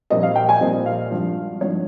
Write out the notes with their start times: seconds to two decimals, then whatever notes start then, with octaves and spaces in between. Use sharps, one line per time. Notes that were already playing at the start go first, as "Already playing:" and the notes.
0.10 A#1 A#2 G3 C4 D#5
0.23 F5
0.36 G5
0.49 G#5
0.61 A#1 A#2 G3 C4 D#5
0.86 F5
1.11 G#1 G2 F3
1.61 G#1 G2 F3 C#5